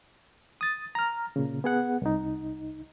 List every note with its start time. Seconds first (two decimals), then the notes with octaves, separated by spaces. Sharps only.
0.61 D#6 A6
0.95 A#5 F6
1.36 A#2 C#3
1.64 B3 G#4 F#5
2.02 C2 D#4